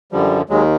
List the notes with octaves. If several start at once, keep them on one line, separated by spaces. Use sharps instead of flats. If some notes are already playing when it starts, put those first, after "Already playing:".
F#2 D3 F3 G3
D#2 D#3 F#3 G#3